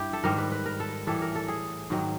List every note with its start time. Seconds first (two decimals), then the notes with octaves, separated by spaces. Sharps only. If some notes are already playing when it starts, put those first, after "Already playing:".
Already playing: G2 E4 G4
0.13 A4
0.23 G#2 D#3 G3 A#4
0.38 B4
0.52 B4
0.66 A#4
0.80 A4
1.07 A2 E3 G3 A4
1.22 A#4
1.35 A4
1.48 G#4
1.90 G#2 D#3 F#3